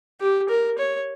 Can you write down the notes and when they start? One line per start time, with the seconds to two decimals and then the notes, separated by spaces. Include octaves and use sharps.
0.21 G4
0.49 A#4
0.79 C#5